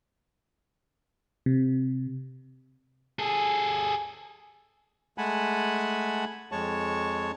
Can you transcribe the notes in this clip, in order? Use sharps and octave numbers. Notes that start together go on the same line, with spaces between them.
C3
G#4 A4
G#3 A3 F#5 G#5 A5 B5
F2 G#3 C#5 A5 C#6